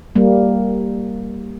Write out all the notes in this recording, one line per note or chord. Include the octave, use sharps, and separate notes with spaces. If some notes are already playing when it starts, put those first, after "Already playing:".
G3 A#3